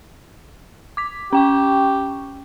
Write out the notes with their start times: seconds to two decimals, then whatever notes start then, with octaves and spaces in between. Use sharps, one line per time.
0.97 D6 B6
1.33 C#4 G4 G5 C#6